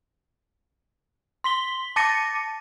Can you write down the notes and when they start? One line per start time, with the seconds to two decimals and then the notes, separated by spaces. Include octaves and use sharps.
1.44 C6 B6 G7
1.96 A5 D6 A6 A#6 C#7 D#7